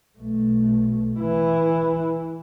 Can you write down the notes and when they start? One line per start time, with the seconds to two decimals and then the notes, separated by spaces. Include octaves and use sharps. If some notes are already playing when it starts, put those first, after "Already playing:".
0.18 B1 A3
1.19 E3 E4